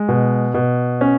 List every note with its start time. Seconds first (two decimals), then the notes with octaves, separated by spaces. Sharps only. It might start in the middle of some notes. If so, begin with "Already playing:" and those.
Already playing: G#3
0.09 B2
0.54 B2
1.01 C#4